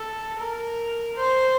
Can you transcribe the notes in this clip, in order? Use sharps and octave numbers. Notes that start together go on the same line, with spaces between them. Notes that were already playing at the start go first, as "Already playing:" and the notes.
Already playing: A4
A#4
C5